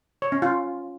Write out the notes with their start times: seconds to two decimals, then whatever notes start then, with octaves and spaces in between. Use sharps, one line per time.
0.22 C#5
0.32 C#4
0.42 F4